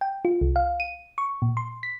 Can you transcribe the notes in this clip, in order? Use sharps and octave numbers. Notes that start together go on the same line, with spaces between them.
G5
F4
C2
F5
D#7
C#6
A#2
C6
B6